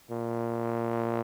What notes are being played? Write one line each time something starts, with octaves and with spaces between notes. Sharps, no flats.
A#2